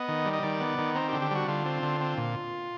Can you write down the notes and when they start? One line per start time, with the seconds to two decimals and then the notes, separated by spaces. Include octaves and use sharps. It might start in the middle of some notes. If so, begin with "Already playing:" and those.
Already playing: B3 D#5
0.08 D#3
0.25 G3
0.33 D#5
0.43 D#3 D5
0.61 B3
0.78 D#3
0.95 C4 A#4
1.09 G4
1.13 D3
1.22 G4
1.31 G3 F#4
1.48 D3 F4
1.65 C4
1.82 D3
2.00 C4
2.17 A#2